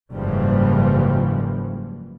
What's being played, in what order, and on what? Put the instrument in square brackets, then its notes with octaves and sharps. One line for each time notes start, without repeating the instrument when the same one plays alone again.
[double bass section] F#1 G#2 C#3 E3 F3 G3